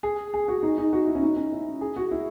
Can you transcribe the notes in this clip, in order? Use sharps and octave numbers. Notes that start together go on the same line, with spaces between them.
G#4
G#4
F#4
D#4
D#4
F#4
E4
C#4
D#4
C#4
E4
G#4
F#4
E4